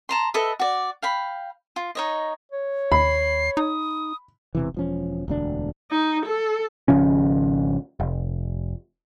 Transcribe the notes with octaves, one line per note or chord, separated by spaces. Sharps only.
A5 A#5 C6
A4 B4 D#5 E5
F#4 D5
F5 G5 B5
F4
D#4 C#5 D#5
C#5
D#2 B5 C7
D#4 D#6
E1 C3 E3
E1 F3 C#4
E1 D2 D4
D#4
A4
G#1 C#3 F3 C#4
F1